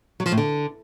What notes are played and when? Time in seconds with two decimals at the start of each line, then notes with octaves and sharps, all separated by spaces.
0.20 F#3
0.26 F3
0.32 A2
0.38 D3